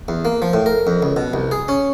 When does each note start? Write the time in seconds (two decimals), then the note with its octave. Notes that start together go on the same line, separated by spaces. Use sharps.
0.08 E2
0.25 A#3
0.42 F3
0.53 A2
0.66 A#4
0.87 F2
1.02 C#2
1.16 B2
1.34 C2
1.51 G#4
1.68 C#4